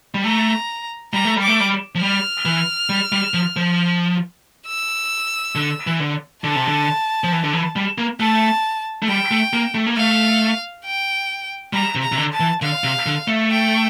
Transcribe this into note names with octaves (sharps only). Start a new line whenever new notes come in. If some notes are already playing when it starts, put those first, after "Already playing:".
G3
A3 A#5
G3 A#5
A3
G3
D6
A3
G3
F3
G3 F6
E3
G3
G3
F3
F3
E6
D3
E3
D3
D3 A5
C3
D3
F3
E3
D3
E3
G3
A#3
A3 A5
A3
G3 G5
A3
A#3
A3
A#3
A3 F5
G5
G3 A#5
C3
A#5
C3
D3
A5
E3
D3 F5
C3
D3
A3
G5